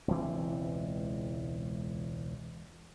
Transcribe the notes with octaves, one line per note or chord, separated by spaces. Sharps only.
E1 C#2 E3 C4